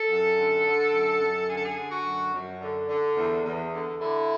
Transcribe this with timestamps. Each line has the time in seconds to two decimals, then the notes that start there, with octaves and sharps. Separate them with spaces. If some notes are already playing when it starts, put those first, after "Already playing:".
Already playing: A4
0.10 F#2
0.38 D3
0.66 D3
0.93 F#2
1.21 F#2
1.49 D3 G#4
1.57 A4
1.65 G#4
1.77 D3
1.91 F#4
2.05 F#2
2.33 F#2
2.61 D3
2.89 D3
3.16 E2
3.44 E2
3.73 D3
4.00 D3 E4